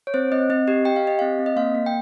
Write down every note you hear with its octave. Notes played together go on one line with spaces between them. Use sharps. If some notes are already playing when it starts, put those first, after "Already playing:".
C#5
C4 C5
C4 D#5
C4 D#5
G4 D#5
G4 G5
F5
G4 D#5
C4 F5
C4
D#5
A#3 F5
A#3
G5